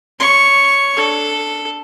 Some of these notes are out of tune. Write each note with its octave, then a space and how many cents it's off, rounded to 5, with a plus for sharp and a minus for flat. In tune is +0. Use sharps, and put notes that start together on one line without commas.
C#5 +10 C#6 +0
D4 +0 A4 +0